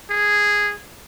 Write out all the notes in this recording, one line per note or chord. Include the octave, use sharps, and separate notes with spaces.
G#4